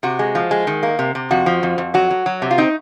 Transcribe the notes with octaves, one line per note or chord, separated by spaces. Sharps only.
C3 F#4
G#3
F3
G#3
D#3
A#3
C3
C3
F2 F#4
F3
F2
F2
F#3 F#4
F#3
F#3
C3
F4
C4 D#4